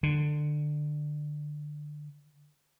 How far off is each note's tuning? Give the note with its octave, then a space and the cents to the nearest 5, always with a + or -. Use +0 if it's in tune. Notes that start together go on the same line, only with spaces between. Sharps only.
D3 +20